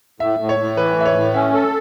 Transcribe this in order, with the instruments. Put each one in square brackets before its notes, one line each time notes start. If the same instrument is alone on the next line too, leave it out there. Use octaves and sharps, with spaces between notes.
[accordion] A2 [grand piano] E5
[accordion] A2
[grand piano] C#5
[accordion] A2
[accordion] E3 [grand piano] B4
[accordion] A2 [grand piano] E5
[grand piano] C#5
[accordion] A2
[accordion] C#4 [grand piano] E5
[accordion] A4